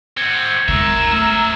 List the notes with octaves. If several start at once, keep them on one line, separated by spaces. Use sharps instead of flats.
C4 F#4 G#6 C#7
D#3 G#3 A#4 E5 A#5 E7
A3 C#4 E5